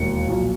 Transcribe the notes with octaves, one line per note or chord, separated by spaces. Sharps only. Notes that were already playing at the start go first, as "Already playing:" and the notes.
Already playing: E1 D#2 D#3 C#7
B1 A#2 F3